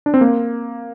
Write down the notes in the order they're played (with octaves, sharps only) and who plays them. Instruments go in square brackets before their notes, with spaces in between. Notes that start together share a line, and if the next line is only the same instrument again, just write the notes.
[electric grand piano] D4
C4
A#3